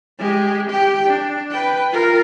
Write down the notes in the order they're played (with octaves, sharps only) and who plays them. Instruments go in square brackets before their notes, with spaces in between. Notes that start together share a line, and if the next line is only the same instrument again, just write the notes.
[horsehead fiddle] G#3 G4
G4 G5
D4
B4 G5
F4 A#4